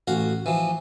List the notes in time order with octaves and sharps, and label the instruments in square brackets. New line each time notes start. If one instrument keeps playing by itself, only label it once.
[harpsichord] A1 F#4 F5
E3 F3